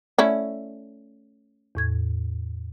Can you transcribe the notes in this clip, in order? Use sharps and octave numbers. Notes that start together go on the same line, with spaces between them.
A3 C#4 E4 D5 E5 F#5
E2 A2 G#6